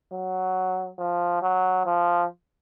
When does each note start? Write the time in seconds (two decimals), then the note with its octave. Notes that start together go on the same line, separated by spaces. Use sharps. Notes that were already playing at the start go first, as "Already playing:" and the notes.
0.13 F#3
0.99 F3
1.42 F#3
1.86 F3